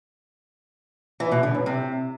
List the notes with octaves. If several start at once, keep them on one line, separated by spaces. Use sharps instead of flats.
E3
B2
D3
F#2
C3